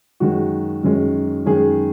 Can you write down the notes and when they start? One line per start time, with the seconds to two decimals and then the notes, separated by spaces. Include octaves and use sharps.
0.20 F#2 D#3 G#3 C#4 F#4
0.83 F#2 D#3 G#3 C#4
1.46 F#2 D#3 G#3 C#4 G#4